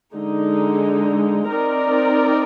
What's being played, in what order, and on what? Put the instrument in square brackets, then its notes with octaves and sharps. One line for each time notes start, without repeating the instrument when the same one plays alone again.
[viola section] D3 G#3 D#4
C4 D#4 A#4 D5